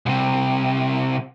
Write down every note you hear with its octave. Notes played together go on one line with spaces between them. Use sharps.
C2 C3